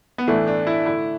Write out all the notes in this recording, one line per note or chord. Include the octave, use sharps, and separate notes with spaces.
B3
A2 E3 A3 D4
D4
E4
D3 A3 E4